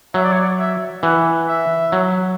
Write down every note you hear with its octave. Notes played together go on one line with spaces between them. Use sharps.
F#3 E5
D5
C#5
D5
E5
E3 F#5
E5
F#3